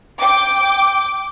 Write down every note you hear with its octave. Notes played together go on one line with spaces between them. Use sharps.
G5 D6